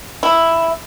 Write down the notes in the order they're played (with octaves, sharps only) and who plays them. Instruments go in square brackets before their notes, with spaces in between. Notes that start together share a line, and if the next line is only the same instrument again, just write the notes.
[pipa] E4